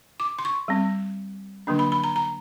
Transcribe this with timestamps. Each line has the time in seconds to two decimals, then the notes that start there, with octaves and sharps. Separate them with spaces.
0.20 D6
0.39 C6
0.45 C#6
0.68 G3 C4
1.67 D3 F#3 A#3 D4
1.79 B5
1.92 B5
2.04 A#5
2.16 A#5